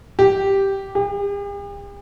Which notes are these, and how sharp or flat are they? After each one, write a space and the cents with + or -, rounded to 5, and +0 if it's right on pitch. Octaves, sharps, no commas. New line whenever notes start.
G4 -5
G4 +45